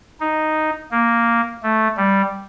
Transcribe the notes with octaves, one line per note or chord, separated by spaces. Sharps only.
D#4
A#3
A3
G3